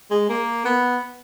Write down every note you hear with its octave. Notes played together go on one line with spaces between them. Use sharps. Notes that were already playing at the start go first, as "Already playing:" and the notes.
G#3
A#3
B3